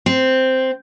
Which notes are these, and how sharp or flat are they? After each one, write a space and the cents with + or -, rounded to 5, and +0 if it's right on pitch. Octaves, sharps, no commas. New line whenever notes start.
C4 -5